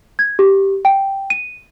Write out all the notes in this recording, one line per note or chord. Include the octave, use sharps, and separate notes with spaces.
G#6
G4
G5
D#7